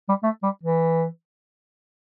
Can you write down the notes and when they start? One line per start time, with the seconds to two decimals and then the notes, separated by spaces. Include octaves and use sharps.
0.09 G3
0.23 A3
0.43 G3
0.63 E3